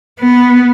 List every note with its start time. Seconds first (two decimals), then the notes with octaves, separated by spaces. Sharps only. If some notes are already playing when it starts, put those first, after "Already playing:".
0.20 B3